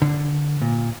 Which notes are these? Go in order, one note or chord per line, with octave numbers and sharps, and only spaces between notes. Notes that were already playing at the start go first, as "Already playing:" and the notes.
D3
A#2